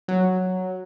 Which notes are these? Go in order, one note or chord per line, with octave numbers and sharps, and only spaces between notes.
F#3